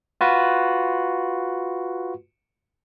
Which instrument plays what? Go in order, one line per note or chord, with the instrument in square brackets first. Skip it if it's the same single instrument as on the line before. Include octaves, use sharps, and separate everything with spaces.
[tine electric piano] F4 F#4 B4